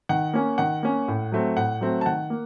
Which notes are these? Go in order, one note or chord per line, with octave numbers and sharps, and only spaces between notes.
D#3 F#5
A#3 C#4
D#3 F#5
A#3 C#4
A2
F#3 A3 C4
A2 F#5
F#3 A3 C4
A5
D#3 F#5
A#3